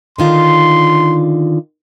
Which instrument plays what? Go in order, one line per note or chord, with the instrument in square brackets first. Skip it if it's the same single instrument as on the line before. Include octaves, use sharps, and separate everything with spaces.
[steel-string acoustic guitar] D3 D#3 F4 [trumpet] C6